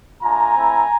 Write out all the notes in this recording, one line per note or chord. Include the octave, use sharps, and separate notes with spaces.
A3 D4 F4 G#5 A#5
A3 C4 E4